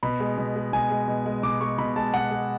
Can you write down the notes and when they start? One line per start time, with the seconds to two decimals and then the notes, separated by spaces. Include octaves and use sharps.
0.03 B2 B5
0.20 G#3
0.38 B2
0.56 G#3
0.73 B2 G#5
0.91 G#3
1.08 B2
1.26 G#3
1.43 B2 D6
1.61 G#3 C#6
1.78 B2 B5
1.96 G#3 A5
2.14 B2 F#5
2.31 G#3